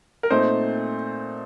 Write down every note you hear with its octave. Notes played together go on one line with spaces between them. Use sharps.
A#4
A#2 A3 C4 D#4 C5